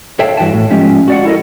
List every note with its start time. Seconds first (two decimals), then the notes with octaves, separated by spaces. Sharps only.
0.19 A4 C#5 E5 F5 G5 A5
0.37 G2 E3 F#4 G5 A5
0.54 A2
0.70 F3 G#3 C#4 G4
1.08 F#4 D5 F#5
1.25 E4 A4 A#4 D#5